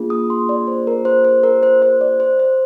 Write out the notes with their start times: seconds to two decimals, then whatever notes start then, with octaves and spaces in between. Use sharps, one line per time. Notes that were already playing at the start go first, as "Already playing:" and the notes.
Already playing: A#3 D4 F4 G#4
0.10 D#6
0.30 C6
0.49 D5
0.68 C5
0.87 A#4
1.05 C5
1.25 C5
1.43 A#4
1.63 C5
1.82 C5
2.01 D5
2.20 C5
2.39 C5